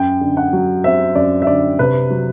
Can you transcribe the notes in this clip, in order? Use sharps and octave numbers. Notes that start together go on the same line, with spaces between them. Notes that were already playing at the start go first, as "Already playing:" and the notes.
Already playing: F#2 G5
D3
F#5
F#3
C4 E5
F#2 D5
E5
D3 D5
C3 B4
F#3